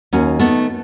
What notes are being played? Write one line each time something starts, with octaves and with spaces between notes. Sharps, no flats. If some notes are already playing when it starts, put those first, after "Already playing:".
D#2 C#4 F#4
A3 B3 D#4